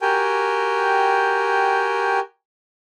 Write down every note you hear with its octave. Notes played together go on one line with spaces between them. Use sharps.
F#4 G4 A#4 G5 G#5